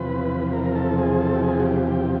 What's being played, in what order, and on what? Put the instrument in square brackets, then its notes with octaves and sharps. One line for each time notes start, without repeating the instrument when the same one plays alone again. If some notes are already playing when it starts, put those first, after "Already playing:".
Already playing: [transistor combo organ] E2 C3 F3 B4
A#4
A#4
A4
G#4
A4
G4
G#4
F#4
G4
G4